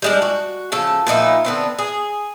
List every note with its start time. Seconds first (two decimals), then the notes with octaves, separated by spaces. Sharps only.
0.02 G3 G#3 D4
0.22 F#4
0.72 C#3 F3 A4
1.07 A#2 F3 D#4 E4
1.45 D3 B3 C4
1.79 G#4